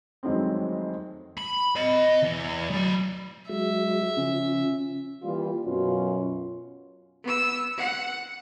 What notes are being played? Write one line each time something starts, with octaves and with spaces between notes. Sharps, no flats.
F2 D#3 F#3 G#3 A3 C4
B5
D#5 B5
E2
F#3 D5
F#3 G#3 E5
C#3 F3 C#4
E3 G3 A#3 F4
F#2 B2 F#3 C#4 F4
B3 E6
F#5